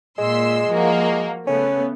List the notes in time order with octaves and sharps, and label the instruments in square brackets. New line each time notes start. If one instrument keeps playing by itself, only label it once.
[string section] A#2 C6 E6 [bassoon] G#3
[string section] F3 A#3 F#4
[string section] C#3 A3 B3 [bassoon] C#4